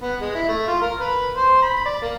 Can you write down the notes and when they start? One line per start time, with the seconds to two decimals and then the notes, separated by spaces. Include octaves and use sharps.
0.03 B3
0.21 G#3
0.35 E4
0.49 A3
0.68 F4
0.81 A#4
1.01 B4
1.37 C5
1.62 B5
1.85 D5
2.02 A#3